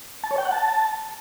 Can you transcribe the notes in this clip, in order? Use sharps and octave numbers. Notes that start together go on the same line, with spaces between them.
A5
C#5
G5
F#5
A5